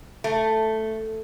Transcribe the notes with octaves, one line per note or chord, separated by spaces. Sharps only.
A3